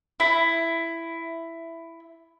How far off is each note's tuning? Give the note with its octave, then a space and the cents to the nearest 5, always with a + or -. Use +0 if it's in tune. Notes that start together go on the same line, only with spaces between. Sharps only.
E4 +10